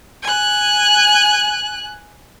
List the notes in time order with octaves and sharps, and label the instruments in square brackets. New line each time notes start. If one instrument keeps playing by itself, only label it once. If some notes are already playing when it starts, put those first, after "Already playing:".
[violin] G#5 F#6